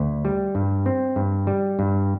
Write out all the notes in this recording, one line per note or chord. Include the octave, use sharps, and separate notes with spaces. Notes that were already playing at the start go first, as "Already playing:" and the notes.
Already playing: D2
G3
G2
C4
G2
G3
G2